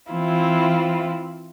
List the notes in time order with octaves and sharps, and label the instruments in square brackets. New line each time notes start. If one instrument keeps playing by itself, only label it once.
[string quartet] E3 C4 E4 F4